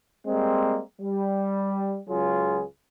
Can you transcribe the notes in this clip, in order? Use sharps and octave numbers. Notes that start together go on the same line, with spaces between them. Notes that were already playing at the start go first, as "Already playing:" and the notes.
G3 G#3 A#3 C4
G3
C#2 F#3 F4 G#4